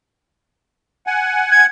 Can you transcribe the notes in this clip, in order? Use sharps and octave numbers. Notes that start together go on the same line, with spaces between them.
F#5 G#5
G#6